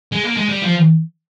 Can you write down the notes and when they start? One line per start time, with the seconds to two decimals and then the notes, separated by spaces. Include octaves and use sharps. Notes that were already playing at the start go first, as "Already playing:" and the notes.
0.12 G#3
0.23 A#3
0.37 G#3
0.49 G3
0.62 F3